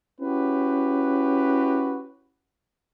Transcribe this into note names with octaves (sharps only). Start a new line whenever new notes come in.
C#4 E4 F#4 G4 B4